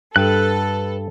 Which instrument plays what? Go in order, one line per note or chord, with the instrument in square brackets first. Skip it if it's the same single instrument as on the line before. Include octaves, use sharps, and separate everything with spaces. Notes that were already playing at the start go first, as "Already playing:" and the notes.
[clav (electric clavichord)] G2 G5 [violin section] A4 [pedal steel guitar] B4 F#6